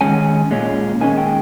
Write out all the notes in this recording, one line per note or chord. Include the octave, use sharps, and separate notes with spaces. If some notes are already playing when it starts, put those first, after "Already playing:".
D#3 G#3 C#4 G#5
A#2 G#3 C#4
D#3 G#3 C#4 G#5
G5